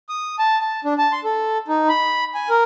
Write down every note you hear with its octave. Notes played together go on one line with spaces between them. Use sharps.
D#6
A5
A5
D4
A5
C6
A4
D#4
B5
G#5
A#4